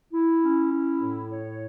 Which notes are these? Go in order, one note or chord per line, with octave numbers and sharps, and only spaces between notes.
E4
C#4
E4
A2
C#5